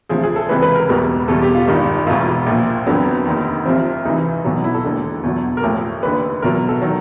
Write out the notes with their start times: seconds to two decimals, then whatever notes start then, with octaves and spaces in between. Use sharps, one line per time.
0.09 D2 C3 F3 G#4
0.23 G#4
0.36 A4
0.49 C#2 C3 E3 B4
0.62 B4
0.75 A#4
0.89 E1 E2 B2 G3 A#4
1.28 E2 B2 G3 A4
1.42 G4
1.55 F4
1.67 G#1 G2 D#3 G3
2.07 E1 E2 B2 F4
2.46 A#1 A#2 F3
2.87 F2 D3 F#3 B3
3.25 F1 D#2 D#3
3.65 C2 C3 F3 C4
4.05 D2 C3 E3 D#4
4.45 B1 B2 F#3
4.64 E4
4.74 A4
4.85 E1 D#2 D3
5.23 E2 B2 F#3
5.57 A#4
5.63 A1 A2 F3 A4
6.03 F1 D#2 D3 B4
6.42 C2 B2 F#3 A#4
6.69 A4
6.81 D#3 F#3